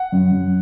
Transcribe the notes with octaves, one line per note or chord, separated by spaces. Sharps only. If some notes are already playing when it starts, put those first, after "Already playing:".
Already playing: F#5
F#2
F#2